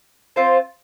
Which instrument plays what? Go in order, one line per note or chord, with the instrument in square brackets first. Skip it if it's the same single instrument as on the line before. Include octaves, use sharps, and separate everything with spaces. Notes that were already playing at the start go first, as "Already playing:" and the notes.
[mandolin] C4 F4 C5